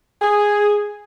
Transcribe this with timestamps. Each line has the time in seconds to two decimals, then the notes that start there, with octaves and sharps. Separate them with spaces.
0.22 G#4